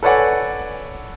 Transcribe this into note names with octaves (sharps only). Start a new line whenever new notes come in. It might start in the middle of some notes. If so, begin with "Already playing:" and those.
A4 B4 C#5 D5 F#5 G#5